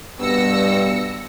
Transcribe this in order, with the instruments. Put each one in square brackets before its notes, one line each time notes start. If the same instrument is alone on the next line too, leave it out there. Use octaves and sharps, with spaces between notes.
[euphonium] G2 [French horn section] B2 G3 B3 [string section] E6 A#6 C#7